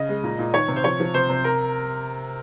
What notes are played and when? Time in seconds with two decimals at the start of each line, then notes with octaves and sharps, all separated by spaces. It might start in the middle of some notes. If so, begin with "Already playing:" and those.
Already playing: C#3 D#5
0.09 G#3
0.23 A#2
0.39 A#2
0.54 D#3 C#5
0.68 C3
0.76 C5
0.84 F3 C#5
1.00 F3
1.14 C3 C5
1.30 C3
1.44 A#4